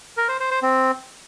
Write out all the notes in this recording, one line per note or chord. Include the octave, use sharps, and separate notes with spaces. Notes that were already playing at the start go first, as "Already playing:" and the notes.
A#4
C5
C5
C5
C4